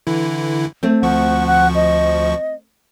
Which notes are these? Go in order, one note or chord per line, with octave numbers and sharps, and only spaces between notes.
D3 E3 E4
A3 C4
D2 F3 F#5 C#6
F#5
D#5